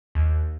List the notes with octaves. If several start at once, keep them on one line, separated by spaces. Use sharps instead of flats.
D#2